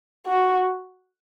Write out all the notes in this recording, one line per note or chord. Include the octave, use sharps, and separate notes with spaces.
F#4